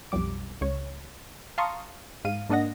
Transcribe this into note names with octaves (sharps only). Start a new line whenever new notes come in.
B1 F2 G3 D6
C#2 C#5
F5 A5 A#5 C6 C#6 D#6
G#2 F5 D#7
G#2 A#3 D4 D#5 F#5 A#6